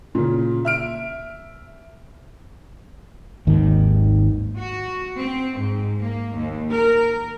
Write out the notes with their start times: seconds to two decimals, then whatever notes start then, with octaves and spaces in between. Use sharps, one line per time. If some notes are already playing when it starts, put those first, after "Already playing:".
0.15 A#2 C#3
0.65 E5 F6 D7
3.47 G#1 D#2 G#2 D#3
4.58 F#4
5.19 C4
5.59 G#2
6.01 A#3
6.36 D#2
6.71 A#4